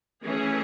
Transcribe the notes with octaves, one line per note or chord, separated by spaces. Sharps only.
E3 A3 C#4 G#4